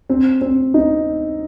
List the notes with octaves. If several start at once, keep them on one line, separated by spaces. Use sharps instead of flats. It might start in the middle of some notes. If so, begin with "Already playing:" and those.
C4
C4
D#4